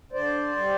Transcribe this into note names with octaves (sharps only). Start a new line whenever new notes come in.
D3 C5 D5
G3